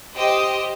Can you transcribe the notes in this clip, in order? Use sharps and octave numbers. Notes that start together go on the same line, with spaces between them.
G4 C5 D#5 G5